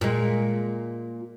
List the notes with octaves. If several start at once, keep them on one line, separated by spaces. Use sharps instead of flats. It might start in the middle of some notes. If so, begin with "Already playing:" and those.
A#2 G#3